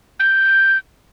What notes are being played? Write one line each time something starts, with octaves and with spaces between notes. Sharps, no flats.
G6